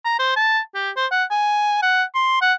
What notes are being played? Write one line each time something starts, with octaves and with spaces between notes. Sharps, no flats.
A#5
C5
A5
G4
C5
F#5
G#5
F#5
C6
F#5